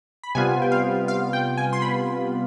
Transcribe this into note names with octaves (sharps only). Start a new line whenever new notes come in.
B5
C3 G3 B3 F4 G#5
G5
F5
F5
G5
G#5
C6
B5